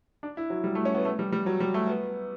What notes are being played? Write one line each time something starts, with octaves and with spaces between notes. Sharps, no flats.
D4
E4
F#3
G3
A3
C#4
B3
A3
G3
G3
F#3
G3
A3
B3